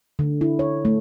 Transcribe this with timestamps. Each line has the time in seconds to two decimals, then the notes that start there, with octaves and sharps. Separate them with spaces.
0.19 D3
0.41 E4
0.59 C#5
0.85 A3